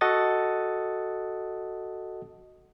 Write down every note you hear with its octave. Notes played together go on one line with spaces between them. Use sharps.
F#4 A4 D#5 F#5 D#6 A6